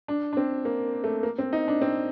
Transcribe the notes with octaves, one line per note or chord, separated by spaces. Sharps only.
D4
D4
C4
A#3
A3
A#3
C4
D#4
D4
C4